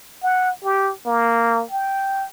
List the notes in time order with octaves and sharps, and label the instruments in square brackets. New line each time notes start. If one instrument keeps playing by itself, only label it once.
[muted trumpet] F#5
G4
A#3
G5